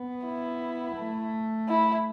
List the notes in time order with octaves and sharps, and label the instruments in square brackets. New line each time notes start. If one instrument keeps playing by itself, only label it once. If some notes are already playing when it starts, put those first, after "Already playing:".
Already playing: [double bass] B3
[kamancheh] E4
[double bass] A3
[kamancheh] E4